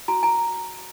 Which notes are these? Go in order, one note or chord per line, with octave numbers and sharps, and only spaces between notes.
F#4 G#5 A#5
G#5 A#5